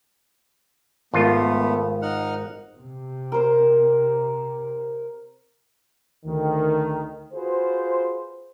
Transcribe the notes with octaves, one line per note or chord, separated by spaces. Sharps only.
G#1 A3 B3 F4
D#4 F#5 F6
C3
A#4 C5
D2 D#3
F4 F#4 G#4 B4 C5